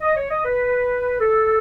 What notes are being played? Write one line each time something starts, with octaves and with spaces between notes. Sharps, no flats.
D#5
C#5
D#5
B4
A4